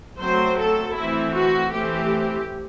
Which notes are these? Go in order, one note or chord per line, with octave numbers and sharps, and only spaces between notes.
F#3 A3 C4 C5
A4
E3 A3 C4 E4
F#4
E3 A3 C4 G4